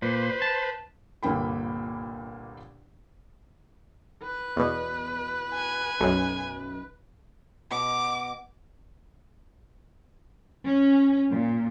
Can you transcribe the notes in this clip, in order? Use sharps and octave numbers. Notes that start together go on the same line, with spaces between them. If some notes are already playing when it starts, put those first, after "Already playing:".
A#2 B4 C5
A5
G1 C2 A#2 A#3 G5 B5
B4
E2 B2
G#5
B1 F#2
B2 D#5 D6
C#4
A#2